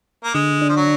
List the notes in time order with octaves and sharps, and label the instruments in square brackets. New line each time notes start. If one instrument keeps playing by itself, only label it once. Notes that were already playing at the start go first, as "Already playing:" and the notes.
[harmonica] A#3
[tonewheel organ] D3 [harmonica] G#3
[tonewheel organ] D4
[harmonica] F3
F#3